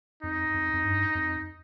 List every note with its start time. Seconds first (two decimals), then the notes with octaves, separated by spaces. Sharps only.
0.23 F2 D#4
0.54 F2
0.74 F2
0.84 G2
1.15 F2